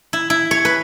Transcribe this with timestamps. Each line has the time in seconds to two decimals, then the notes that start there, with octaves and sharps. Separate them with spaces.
0.13 E4
0.30 E4
0.51 C#5
0.65 B4